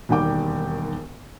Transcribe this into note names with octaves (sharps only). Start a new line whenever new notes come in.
E1 D#2 G3 G5 D6